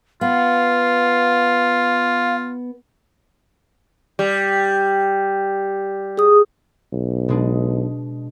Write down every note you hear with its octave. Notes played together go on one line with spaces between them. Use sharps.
B3 F4 F5
G3
G#4 D#6
B1
B2 G#3 D4